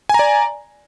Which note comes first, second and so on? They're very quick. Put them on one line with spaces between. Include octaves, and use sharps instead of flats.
G#5 A#5 D5